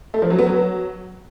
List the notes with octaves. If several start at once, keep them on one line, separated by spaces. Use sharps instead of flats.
A3
F3
F#3
B3
F#3